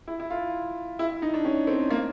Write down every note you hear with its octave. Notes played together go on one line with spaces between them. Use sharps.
E4
E4
F4
E4
D#4
D4
C#4
C4
A#3